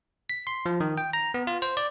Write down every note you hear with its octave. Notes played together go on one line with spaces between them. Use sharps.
B6
C6
F3
D#3
G5
A#5
B3
F4
C5
D5